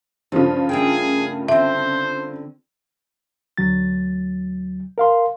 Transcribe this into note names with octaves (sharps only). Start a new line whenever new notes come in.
G2 C#3 F3 F4
A3 G#4 A#4 G5
D3 C4 C5 E5
D2 F#3 A6
A#4 F5 C6